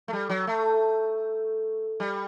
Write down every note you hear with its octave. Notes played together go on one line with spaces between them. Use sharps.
A3
G3
F#3
A3
G3